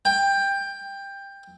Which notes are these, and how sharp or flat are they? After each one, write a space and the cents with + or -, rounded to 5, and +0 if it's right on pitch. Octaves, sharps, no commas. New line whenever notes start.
G5 +15